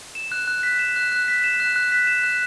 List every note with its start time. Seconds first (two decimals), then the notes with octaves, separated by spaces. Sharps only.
0.15 E7
0.32 F#6
0.48 F#6
0.63 B6
0.79 E7
0.96 F#6
1.12 F#6
1.28 B6
1.44 E7
1.60 F#6
1.76 F#6
1.92 B6
2.07 E7
2.24 F#6